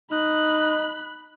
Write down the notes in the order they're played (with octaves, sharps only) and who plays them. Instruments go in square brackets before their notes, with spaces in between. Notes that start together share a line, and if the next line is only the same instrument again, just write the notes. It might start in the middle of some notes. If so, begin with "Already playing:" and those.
[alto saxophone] D#4 [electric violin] B5 F#6